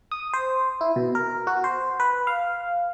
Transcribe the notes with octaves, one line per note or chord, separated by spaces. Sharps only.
D#6
C5
E4
B2
A#4
F#4
C5
B4
F5